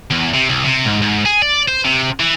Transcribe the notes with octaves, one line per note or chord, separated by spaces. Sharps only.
E2
C3
C2
C3
G#2
G#2
G#4
D5
C5
C3
E3